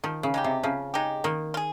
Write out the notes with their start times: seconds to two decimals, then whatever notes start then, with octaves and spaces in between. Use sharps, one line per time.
0.04 D#3 F3
0.23 C#3
0.34 G#3 D#4 G4
0.44 C3
0.63 C#3 F3
0.94 G#3 D#4 G4
1.24 D#3 A#3
1.54 F4
1.57 G#4